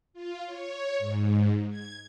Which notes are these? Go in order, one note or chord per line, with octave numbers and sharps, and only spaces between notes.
F4
C#5
G#2
G#6